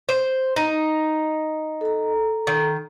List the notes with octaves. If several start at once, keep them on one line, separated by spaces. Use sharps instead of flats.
C5
D#4
A4 A#5
D#3